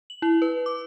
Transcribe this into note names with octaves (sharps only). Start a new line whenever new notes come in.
F#7
E4
B4
D6